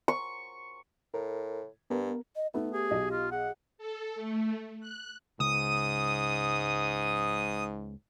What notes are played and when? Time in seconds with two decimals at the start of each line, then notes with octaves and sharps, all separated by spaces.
0.08 C#6
1.14 A2 A#4
1.90 G2 B3 A#4
2.36 D#5
2.54 A3 B3 D#4
2.73 G4 G#4
2.91 B1 D#5
3.11 F4
3.31 G#4 F#5
3.78 A4
4.16 A3
4.81 F#6
5.40 C#2 G#2 D#6